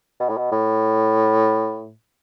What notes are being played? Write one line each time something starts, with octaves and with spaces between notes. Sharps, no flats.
B2
A2
B2
A2